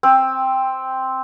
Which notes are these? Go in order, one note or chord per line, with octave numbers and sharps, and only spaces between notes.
C4